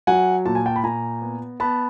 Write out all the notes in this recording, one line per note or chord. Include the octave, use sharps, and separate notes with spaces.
F#3 F#5 G#5
A#2 A5
G#5
G5 A5
B5
A#2 G#5 A#5
B3
B3 A5 B5